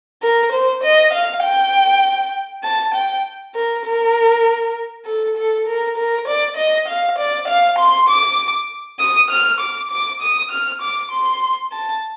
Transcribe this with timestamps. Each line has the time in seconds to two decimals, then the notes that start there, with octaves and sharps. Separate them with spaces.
0.22 A#4
0.52 C5
0.83 D#5
1.13 F5
1.43 G5
2.64 A5
2.94 G5
3.55 A#4
3.86 A#4
5.06 A4
5.37 A4
5.67 A#4
5.97 A#4
6.28 D5
6.57 D#5
6.88 F5
7.18 D5
7.48 F5
7.79 C6
8.09 D6
9.00 D#6
9.30 F6
9.60 D6
9.91 D6
10.21 D#6
10.51 F6
10.82 D6
11.11 C6
11.72 A5